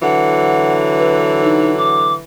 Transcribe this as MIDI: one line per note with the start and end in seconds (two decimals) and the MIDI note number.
0.02 2.23 50
0.02 2.23 52
0.02 2.23 54
0.02 0.73 78
0.99 1.38 71
1.43 1.74 63
1.77 2.13 86